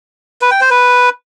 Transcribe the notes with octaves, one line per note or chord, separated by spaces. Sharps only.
B4
G5
C5
B4